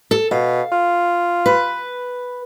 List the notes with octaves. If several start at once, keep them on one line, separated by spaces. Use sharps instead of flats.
A4
B2 F5
F4
B4